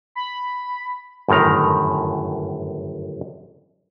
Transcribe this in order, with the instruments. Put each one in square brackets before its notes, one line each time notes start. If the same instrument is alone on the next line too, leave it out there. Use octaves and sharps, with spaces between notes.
[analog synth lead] B5
[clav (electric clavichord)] G1 F#2 A2 D#3 A#5